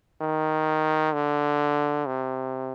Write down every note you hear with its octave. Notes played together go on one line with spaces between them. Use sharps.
D#3
D3
C3